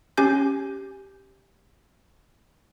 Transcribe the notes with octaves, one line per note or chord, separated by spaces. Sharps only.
C#4 G4 G#5 G6